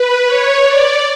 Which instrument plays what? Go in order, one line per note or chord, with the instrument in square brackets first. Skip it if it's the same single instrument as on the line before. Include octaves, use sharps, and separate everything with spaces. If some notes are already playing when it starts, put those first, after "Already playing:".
Already playing: [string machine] B4
C#5
D5